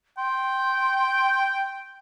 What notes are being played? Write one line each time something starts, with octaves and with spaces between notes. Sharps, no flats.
G5 C6